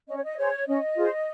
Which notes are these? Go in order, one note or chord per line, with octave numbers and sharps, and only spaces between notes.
C#4 D#5
C#5
D#5
G#4 C5 C#5
C#4 D#5
F4 G#4 C5